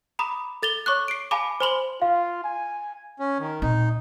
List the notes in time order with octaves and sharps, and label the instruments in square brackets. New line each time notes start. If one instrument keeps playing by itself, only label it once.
[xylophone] A#5 B5 D6 D#6
A4 A6 F7 G7
C#5 C#6 D6 F#6
C7 D7
F5 G#5 A5 B5 D6
C5 G#5 B5 C6 F#7 G7
[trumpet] F4 [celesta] F5
[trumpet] G#5
[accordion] C#4
D#3
[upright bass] A#2 C4 [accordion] D#4